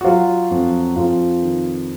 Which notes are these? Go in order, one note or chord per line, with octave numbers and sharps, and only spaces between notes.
F#4
F#3 F4
F2
F2 F4
D#3